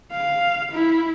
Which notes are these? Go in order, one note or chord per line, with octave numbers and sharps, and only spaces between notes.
F5
E4